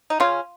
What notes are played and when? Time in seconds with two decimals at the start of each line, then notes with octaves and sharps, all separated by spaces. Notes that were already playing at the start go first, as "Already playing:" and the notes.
0.10 D#4
0.20 C#3 C#4 F4